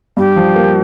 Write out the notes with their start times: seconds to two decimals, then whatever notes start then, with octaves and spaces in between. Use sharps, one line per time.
0.17 G2 G4
0.37 F3
0.56 A#3